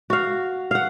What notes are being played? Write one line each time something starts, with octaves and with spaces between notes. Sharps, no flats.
F#4 F5
F5 F#5